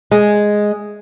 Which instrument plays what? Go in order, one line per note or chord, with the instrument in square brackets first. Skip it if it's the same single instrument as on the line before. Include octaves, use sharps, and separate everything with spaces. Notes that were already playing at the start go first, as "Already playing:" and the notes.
[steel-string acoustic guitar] G#3